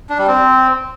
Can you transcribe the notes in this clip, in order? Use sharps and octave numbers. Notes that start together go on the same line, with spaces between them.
D4
G3
C4